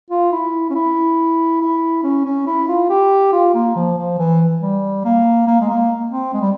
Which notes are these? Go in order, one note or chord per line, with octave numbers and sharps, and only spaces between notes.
F4
E4
C#4
E4
E4
C#4
C#4
E4
F4
G4
F4
A#3
F3
F3
E3
G3
A#3
A#3
G#3
A#3
C4
G#3
G3